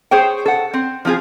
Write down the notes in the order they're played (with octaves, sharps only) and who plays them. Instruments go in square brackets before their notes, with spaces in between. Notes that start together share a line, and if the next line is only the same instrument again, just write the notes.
[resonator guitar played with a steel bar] G#4 C5 C#5 G5
A4 F#5
C4
F3 C4 F4 G#4